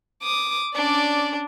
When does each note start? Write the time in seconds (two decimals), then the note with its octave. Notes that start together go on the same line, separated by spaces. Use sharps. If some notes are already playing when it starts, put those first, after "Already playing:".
0.23 D6 D#6
0.75 C#4 D4 D5